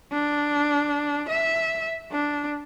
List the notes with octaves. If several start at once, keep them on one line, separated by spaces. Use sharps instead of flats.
D4
E5
D4